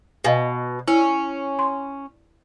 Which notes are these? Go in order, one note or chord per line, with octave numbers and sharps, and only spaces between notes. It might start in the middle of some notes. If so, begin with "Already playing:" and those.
B2 D#5 F5 G#5
C#4 E4
C6